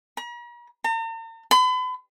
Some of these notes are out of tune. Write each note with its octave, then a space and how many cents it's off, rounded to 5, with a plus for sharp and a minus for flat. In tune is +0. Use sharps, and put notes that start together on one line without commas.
A#5 +45
A#5 -45
B5 +40